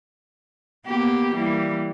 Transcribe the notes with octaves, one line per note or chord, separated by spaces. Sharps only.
A#3 B3 G4
E3 G3 A#3